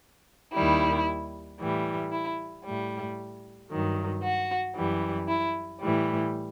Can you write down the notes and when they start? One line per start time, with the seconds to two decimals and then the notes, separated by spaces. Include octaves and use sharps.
0.54 D#2 D#3 G3 E4
1.59 A2 E3 G3
2.12 E4
2.64 A2 G3
3.69 G2 D#3 F#3
4.23 F#4
4.75 F#2 E3 G3
5.28 E4
5.80 A2 E3 G3